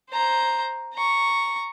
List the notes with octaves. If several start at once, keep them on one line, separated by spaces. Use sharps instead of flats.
C5 A#5
A#5 C#6